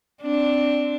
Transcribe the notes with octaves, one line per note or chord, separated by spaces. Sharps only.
C4 D4